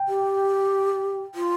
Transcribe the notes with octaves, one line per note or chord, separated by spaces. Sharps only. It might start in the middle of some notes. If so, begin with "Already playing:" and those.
Already playing: G5
G4
F4